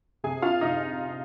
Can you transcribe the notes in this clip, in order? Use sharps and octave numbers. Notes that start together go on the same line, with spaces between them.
C3 G#4 G#5
F4 F5
C3 D#4 D#5